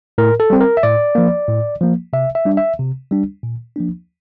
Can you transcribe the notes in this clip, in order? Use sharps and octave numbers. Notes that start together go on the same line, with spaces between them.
A2 A#4
A4
G3 C4
A#4
E5
A2 D5
F3 A#3
A2
F3 A#3
C3 E5
E5
G3 D4
E5
C3
G3 D4
A#2
F3 A#3 D4